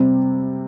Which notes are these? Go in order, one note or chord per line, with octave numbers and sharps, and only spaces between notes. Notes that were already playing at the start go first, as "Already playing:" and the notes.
Already playing: C3 G3 C4